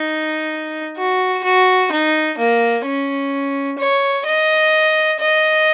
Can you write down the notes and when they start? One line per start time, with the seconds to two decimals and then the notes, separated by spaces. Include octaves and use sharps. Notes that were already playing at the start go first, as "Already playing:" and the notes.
Already playing: D#4
0.97 F#4
1.44 F#4
1.92 D#4
2.38 A#3
2.85 C#4
3.79 C#5
4.26 D#5
5.20 D#5